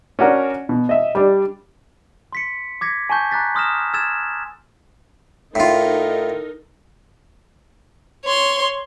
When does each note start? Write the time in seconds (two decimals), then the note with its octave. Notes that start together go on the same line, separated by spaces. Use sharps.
0.19 C#4 D4 F#4 A#4
0.69 B2
0.89 D#5 E5
1.15 G3 D4
2.32 C6 B6 C#7
2.81 D6 G#6 A#6 B6 C#7
3.10 G#5 A5 C#6 G6
3.31 A#5 D6 F#6 G6 A6 B6
3.55 C6 D#6 F6 A#6 E7
3.94 E6 F6 G#6 A6 E7
5.55 A2 D#4 F4 A4 A#4
8.25 C#5 C6